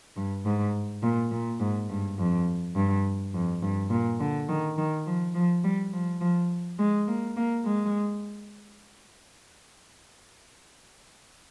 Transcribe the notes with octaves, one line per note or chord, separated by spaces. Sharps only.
G2
G#2
A#2
A#2
G#2
G2
F2
G2
F2
G2
A#2
D3
D#3
D#3
F3
F3
G3
F3
F3
G#3
A#3
A#3
G#3